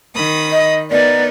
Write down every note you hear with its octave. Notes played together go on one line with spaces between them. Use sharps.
D#3 B5 D#6
D#5
B3 D#4 A#4 D5